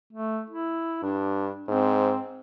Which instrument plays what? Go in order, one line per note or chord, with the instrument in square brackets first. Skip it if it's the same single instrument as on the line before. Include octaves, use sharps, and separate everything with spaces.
[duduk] A3
E4
[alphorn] G2 [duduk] D4
[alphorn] G#2 [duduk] C4